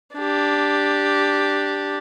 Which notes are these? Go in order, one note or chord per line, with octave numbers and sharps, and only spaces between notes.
D4 G4